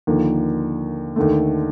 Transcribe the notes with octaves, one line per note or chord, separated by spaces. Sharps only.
D#2 D3 F3 A#3
D#2 D3 A3